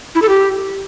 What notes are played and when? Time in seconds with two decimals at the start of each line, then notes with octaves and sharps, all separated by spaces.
0.15 E4
0.22 A4
0.29 G4